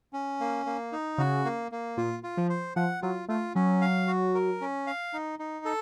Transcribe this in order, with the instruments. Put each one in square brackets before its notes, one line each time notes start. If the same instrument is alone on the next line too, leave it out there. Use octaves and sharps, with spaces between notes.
[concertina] C#4
A#3
A#3
D#4
[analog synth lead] C#3 [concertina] F#4
[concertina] A#3
A#3
[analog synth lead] A#2 [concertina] F4
[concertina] F4
[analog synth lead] F3
[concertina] C5
[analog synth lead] F3 [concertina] F#5
[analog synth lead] F#3 [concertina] F4
[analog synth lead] A3 [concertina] F4
[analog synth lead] F#3 [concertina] C#4
[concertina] F5
F#4
A#4
C#4
F5
D#4
D#4
A4